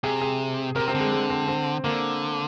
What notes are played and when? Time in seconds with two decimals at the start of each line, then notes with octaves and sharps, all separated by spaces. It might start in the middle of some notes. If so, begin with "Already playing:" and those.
0.03 C3 G#4
0.21 G#4
0.75 C3 A#4
0.88 C4
0.94 D3
1.00 G#3
1.12 G#3
1.30 C4
1.48 C4
1.84 D3 A#3